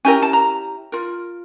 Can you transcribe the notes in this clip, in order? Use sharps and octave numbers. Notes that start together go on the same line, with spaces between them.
C#4 E4 G4 A#4 G#5
A5
A#5
F4 A#4